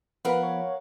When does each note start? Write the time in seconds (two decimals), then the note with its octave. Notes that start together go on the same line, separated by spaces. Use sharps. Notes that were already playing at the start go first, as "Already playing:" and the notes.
0.25 F3 B3 A#4 B4 F5 F#5 B5
0.43 C#5